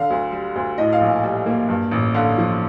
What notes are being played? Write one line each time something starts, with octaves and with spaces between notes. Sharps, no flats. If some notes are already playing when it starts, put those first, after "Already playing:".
Already playing: D3 F5
D2
G3
D2
A2 D#5
F5
A#1
G3
A#3
G2
A1
D3 F5
F3